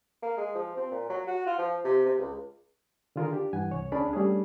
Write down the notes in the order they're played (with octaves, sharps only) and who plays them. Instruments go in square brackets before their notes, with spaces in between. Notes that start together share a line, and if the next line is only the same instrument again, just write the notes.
[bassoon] A#3
G#3
F3
C4
A#2
F#3
F#4
F4
F3
C3
C3
C#2
[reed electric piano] D3 D#3 F4 G#4 A#4
D4 G4
G2 E3 F#5 G#5
C2 C#5
D2 C#4 D4 G#4 D5 B5
G3 A3 C#4 D4 G#4